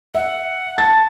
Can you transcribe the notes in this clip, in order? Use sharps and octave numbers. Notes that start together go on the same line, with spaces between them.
E5 F#5
A5 A6